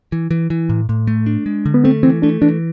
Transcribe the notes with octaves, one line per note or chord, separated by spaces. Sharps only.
E3
E3
E3
A2
A2
A3
D4
G#3
D3
B3
A3 C4
E3 C4
A3 D4
E3 D4